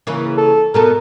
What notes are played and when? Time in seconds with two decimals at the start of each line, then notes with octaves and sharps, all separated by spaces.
0.07 C#3 E3 A#3
0.38 A4
0.74 B2 B3 A4 A#4